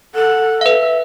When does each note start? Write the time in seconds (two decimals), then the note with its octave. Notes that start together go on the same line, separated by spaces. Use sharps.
0.15 A4 F#5
0.61 B4 E5 F5